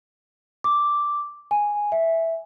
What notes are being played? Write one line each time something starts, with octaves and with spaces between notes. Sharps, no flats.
D6
G#5
E5